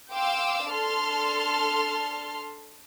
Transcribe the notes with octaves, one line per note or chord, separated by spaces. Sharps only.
F5 G5 C6 D6 E6
D4 A4 A5 C6 F6